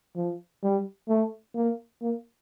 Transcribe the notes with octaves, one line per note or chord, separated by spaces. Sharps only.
F3
G3
A3
A#3
A#3